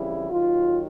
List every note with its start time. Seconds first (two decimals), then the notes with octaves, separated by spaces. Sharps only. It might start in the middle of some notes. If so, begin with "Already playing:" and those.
Already playing: F2 C#3 E3 G3 E4
0.30 D#2 D#3 F#3 F4